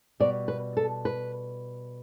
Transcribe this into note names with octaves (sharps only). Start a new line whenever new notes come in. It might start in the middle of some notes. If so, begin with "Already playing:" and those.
B2 G3 D5
B4
A4
B4